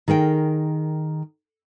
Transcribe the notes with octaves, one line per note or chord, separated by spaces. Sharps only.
D#3 G#4 A#4 G5